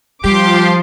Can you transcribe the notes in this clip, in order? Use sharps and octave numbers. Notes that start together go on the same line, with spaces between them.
F3 G3 G4 C6 D6